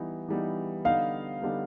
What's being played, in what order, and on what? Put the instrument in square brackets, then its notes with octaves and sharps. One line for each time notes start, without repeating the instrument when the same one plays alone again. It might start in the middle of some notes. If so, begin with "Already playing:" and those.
Already playing: [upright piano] E3 G3 B3 D#4
E3 G3 B3 D#4
[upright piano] D3 G3 B3 D#4 [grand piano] F5
[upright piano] D3 G3 B3 D#4